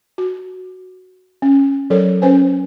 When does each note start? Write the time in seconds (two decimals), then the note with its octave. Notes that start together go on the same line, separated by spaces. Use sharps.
0.18 F#4
1.42 C#4
1.90 F#3 A4 A#4 C#5
2.22 C#4 B4 C5 G#5